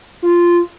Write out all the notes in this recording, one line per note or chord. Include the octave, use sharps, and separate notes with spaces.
F4